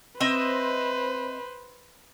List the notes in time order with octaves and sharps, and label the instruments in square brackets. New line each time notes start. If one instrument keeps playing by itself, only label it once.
[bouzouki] C4 D#5 E5 [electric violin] B4 C5